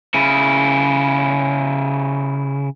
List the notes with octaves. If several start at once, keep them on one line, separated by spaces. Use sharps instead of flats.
C#3 E4